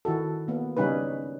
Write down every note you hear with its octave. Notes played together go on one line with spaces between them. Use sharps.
D#3 E4 F#4 A4
A#3 B3
C#3 G3 C#4 D#4 B4